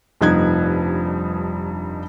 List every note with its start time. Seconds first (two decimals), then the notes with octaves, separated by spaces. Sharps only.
0.21 F1 G2 F3 D#4 F#6 G#6